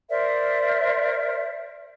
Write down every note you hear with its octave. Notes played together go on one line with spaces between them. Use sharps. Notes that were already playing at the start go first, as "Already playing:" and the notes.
A#4 C5 D5 E5